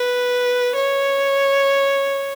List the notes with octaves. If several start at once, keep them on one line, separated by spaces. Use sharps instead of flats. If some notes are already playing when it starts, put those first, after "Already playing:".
Already playing: B4
C#5